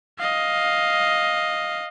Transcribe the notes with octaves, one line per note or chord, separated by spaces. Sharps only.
D#5 F5